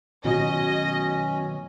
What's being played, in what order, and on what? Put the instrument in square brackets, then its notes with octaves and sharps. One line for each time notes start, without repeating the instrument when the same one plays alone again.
[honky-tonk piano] B2 [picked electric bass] D#3 F#3 [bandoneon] C#4 [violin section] D#5